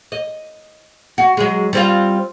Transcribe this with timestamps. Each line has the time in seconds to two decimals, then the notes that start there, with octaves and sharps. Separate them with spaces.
0.12 D#5
1.18 F#4
1.37 F#3 G#3
1.73 G3 C4 F4